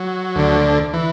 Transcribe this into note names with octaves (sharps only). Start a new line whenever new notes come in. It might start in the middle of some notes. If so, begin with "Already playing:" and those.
Already playing: F#3
D2 D3
E3